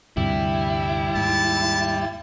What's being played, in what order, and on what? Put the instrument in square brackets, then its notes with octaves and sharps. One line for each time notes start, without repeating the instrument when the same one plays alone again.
[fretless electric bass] D2 G2 C3 [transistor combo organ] G3 [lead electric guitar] E4
[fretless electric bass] D#2 G#2 [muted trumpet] A5